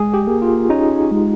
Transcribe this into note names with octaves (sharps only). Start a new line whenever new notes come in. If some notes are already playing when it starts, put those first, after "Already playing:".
Already playing: G#3 G#4
G4
A#3
F4
C#4 D#4
G#3